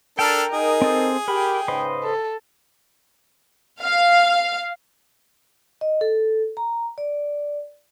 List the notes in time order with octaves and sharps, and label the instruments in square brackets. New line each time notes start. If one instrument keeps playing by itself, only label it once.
[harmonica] D4 A4 [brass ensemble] A#4 [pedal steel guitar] G5 A#5 [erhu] F6
[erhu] D#4 [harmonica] G#4
[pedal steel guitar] C4 A4 C5
[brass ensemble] G4 [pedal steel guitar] A#4 B5 [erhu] G5
[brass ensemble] G#2 C#3 [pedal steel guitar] B4 C5 D#5
[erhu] A4
[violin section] F5
[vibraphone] D#5
A4
A#5
D5